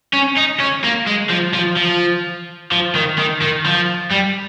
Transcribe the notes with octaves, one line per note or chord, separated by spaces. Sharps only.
C#4
D#4
C#4
A#3
G#3
F3
F3
F3
F3
D#3
D#3
D#3
F3
G3